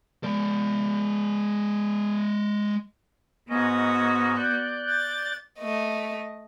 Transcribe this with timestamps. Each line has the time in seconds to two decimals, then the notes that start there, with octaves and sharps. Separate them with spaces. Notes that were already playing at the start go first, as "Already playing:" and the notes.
0.24 G#3 D5
3.49 G#2 B3 C#4 F#4 D#5
4.35 D5 F#6 G6
4.90 A6
5.59 A3 D#5